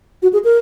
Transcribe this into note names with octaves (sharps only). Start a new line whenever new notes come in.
F#4
G#4
A#4